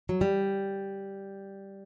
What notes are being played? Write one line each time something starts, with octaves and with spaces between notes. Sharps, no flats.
F#3
G3